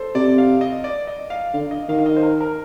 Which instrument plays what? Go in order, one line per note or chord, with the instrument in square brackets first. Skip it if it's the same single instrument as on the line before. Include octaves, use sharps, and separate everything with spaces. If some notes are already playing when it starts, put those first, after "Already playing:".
Already playing: [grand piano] A4 C5
[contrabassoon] C3 [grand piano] D5
[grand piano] F5
D#5
D5
D#5
F5
[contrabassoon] D3 [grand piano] F5
[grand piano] D#5
[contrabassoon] D#3 [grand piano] F5
[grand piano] F5
D#5
C5
A#4
A#4